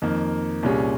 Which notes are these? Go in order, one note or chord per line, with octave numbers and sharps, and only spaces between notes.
F2 D#3 A#3
C2 A#2 G3 C#4 G#4